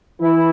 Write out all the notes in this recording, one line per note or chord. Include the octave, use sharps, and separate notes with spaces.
E3 E4